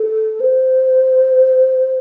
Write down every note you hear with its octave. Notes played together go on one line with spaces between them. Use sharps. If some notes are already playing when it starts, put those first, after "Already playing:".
Already playing: A4
C5